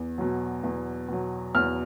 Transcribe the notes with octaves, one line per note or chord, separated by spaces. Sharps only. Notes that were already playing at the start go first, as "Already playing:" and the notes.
Already playing: E2
B2 F#3
E2
B2 F#3
E2 F6